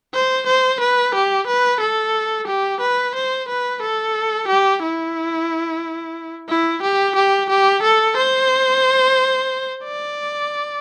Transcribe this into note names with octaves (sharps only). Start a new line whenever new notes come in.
C5
C5
B4
G4
B4
A4
G4
B4
C5
B4
A4
G4
E4
E4
G4
G4
G4
A4
C5
D5